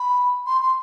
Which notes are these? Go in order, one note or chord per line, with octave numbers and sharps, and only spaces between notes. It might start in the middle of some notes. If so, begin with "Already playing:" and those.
Already playing: B5
C6
C6